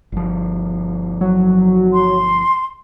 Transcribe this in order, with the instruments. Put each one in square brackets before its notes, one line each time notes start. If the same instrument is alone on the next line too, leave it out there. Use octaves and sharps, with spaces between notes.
[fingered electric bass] G1 F3
[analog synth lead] F#3
[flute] C6